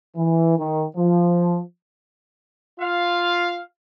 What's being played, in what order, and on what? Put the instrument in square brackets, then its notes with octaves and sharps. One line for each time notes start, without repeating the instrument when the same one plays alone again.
[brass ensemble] E3
D#3
F3
F4 F5